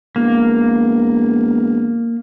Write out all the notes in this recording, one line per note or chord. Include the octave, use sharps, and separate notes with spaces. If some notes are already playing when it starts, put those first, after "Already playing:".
E1 A#3